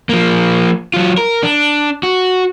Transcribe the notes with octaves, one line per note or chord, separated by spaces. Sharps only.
F3 A#3
F#3 F4
A#4
D4
F#4